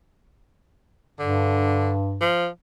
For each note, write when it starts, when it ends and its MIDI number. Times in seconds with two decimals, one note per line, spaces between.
1.19 2.31 43
1.19 1.92 50
2.21 2.47 53